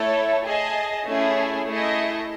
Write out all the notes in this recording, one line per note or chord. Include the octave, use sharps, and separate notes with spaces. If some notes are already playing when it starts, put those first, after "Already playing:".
Already playing: A3 E4 A4 C#5
G#4 D#5 A5
A3 C#4 E4 G#4
A3 E4 G#4 D#5